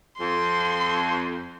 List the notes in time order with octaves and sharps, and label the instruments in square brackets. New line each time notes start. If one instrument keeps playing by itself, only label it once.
[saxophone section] F2 [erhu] C6